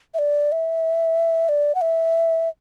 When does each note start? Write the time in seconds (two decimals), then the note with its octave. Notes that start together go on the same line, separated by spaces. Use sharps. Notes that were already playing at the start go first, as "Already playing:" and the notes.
0.14 E5
0.19 D5
0.52 E5
1.49 D5
1.75 F#5
1.81 E5